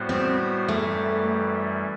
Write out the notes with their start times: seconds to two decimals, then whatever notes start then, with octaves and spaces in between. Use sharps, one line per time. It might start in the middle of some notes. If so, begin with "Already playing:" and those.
Already playing: A2 G3 B3 F#4 C5
0.09 C4
0.68 F#2 E3 G3 A3